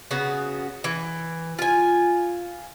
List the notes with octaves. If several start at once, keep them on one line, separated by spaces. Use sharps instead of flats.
C#3 B3 F#4
E3
F4 G#5